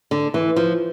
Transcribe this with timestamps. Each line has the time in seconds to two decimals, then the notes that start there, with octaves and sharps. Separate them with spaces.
0.11 D3
0.34 E3
0.56 F3